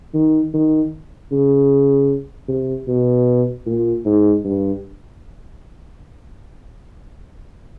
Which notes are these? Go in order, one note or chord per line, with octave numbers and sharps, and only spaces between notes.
D#3
D#3
C#3
C3
B2
A#2
G#2
G2